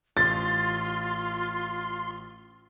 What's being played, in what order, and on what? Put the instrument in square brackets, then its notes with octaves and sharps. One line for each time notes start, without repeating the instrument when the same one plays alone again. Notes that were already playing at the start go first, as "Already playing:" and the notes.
[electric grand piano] A1 [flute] F4 [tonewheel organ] C6 [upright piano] A6